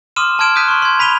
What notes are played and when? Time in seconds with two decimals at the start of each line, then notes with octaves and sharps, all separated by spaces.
0.16 C6 D6 D#6 F6 D#7 E7
0.39 A5 C6 F6 G#6 D7 E7
0.56 D#6 F#6 G6 B6 D#7
0.68 C6 C#6
0.82 C6 G#6
0.99 B5 B6 D#7 F7 G7